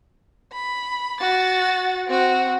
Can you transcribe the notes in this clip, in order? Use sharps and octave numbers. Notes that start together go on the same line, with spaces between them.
B5
F#4 A6
C4 F#4